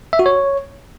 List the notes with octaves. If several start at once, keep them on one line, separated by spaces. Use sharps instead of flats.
E5
F#4
C#5